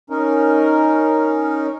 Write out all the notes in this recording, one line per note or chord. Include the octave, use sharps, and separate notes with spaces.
C#4 D#4 A#4